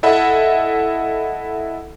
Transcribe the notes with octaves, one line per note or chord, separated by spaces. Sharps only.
E4 A4 D#5 E5 F#5 B5